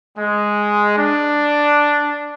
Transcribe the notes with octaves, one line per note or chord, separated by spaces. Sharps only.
G#3
D4